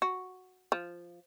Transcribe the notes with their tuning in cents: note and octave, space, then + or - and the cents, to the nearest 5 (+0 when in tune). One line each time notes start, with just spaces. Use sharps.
F#4 -5
F3 -5